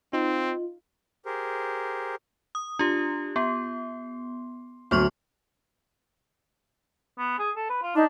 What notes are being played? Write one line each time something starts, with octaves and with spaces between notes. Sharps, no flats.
C4 D#4 F4
G4 G#4 A#4 C5
D#6
D4 F4 G4
B3 C6
D2 F#3 B3 C6 C#6 F6
B3
G#4
A4
B4
F4
D4 D#4